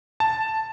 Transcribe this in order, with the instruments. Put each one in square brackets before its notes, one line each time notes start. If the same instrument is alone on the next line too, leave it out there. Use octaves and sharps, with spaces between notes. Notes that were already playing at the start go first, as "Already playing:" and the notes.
[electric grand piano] A5